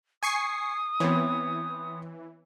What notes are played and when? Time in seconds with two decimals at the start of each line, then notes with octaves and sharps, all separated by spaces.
0.23 G#5 C#6 D#6 C7
1.00 E3 B3 C4 C#5